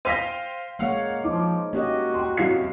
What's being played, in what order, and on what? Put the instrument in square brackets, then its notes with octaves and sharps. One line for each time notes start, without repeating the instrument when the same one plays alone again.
[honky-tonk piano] C5 F5 G5 [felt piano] A#6 B6 D#7
[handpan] G#3 A#3 C#5 [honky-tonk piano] F5 F#5
[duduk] F3 [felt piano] D#4 [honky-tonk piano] D6
[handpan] A#3 G4 D#5 [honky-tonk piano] C#4 [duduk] F#4
[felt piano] G5 C6
[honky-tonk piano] F#2 C3 [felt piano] F#3 F5 C7